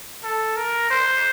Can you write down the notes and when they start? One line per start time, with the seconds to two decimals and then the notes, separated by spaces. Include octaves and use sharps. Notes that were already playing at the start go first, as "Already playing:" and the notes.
0.24 A4
0.57 A#4
0.90 C5